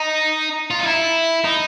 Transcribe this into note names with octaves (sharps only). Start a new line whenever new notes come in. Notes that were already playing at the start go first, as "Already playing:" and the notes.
Already playing: D#4
F4
D#4
E4
D#4